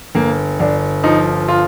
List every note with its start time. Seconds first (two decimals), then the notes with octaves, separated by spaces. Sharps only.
0.15 G1 A#3
0.60 G1 D4
1.04 F3 D#4
1.48 F4